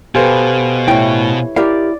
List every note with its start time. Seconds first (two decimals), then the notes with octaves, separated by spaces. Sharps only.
0.15 B2 G4 A4 B4 C5 F5 G#5
0.88 A2 E4 C#5 G5
1.56 E4 G4 A#4 D5 F5